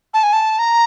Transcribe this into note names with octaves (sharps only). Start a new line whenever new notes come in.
A5
G#5
A5
A#5